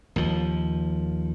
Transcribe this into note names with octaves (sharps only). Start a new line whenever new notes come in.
D#2 F3